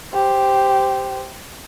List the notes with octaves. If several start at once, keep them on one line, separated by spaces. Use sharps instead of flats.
G4 C5